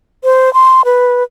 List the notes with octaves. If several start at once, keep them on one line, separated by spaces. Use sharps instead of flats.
C5
C6
B4